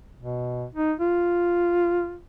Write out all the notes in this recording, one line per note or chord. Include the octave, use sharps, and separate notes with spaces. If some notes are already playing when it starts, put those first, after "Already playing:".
B2
D#4
F4